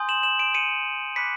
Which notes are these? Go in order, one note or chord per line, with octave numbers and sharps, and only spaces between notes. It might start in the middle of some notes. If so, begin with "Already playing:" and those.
Already playing: G#5 C6 D#6 G6
E7 F#7
E7 F#7
D7 E7
C#7 D#7
B5 D6 F#6 B6 C#7